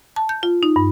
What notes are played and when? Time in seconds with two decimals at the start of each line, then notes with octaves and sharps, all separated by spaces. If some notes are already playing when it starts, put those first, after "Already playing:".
0.16 A5
0.29 G6
0.43 F4
0.63 D#4
0.76 G2